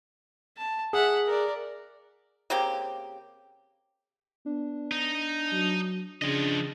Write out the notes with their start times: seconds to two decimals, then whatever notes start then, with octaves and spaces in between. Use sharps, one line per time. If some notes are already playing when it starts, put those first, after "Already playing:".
0.57 A5
0.93 G#4 E5 F#5
1.26 A#4 D5
2.50 C#3 A#3 C4 G4
4.46 B3 D4
4.91 D#4
5.53 F#3
6.22 C#3 F3 D4 D#5